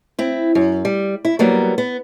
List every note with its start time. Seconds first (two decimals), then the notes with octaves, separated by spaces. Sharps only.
0.19 C4 E4
0.55 F#2
0.85 G3
1.25 E4
1.39 F#3 G3 A#3 B3
1.78 B3